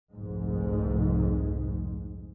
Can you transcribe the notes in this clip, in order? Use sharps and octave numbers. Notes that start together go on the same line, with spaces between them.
F1 C2 G#2